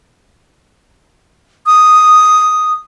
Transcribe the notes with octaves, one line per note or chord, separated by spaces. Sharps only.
D#6